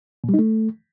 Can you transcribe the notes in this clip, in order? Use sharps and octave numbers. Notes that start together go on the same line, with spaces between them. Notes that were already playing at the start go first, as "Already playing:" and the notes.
A#2
G3
D#4
A3